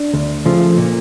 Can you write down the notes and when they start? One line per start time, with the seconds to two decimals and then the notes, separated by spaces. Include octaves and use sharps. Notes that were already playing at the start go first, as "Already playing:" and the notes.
Already playing: D4
0.14 D2
0.45 C#3 F3 A3
0.77 A#2